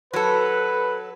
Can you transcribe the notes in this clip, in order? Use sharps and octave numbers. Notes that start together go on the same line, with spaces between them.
F#3 A4 B4